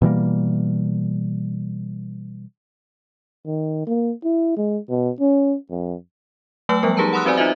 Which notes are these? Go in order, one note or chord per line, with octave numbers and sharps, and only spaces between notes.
B2 E3 G3 A#3
D#3
A#3
E4
G#3
B2
C#4
F2
F#3 A3 B4 G5 E6 F#7
F3 G3 B3 A#4
D#4 G4 G#4 B4 A5 A#5
F#5 B5 C6 D#6 E6 F#6
C4 F#4 B4 C5 D5 G#5
D#4 F4 C5 D#5 E5